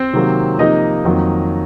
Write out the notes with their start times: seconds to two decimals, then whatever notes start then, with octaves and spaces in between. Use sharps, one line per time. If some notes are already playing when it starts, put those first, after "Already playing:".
Already playing: C4 C5
0.13 C3 D#3 F#3 A#3
0.59 C3 F3 A#3 D#4 D#5
1.05 F2 D#3 F#3 A#3